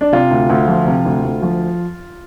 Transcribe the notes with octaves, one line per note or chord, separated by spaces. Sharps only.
D4
C3 F4
D2
D2
F3
C3
D2
D2
F3